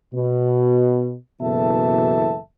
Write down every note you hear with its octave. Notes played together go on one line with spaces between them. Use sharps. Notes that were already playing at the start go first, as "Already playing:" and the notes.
B2
F#1 B2 E3 A4 E5 A5